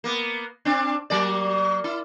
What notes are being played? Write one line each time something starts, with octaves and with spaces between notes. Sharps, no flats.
A#3 B3
C4 D4
F#3 A#3 D5
E4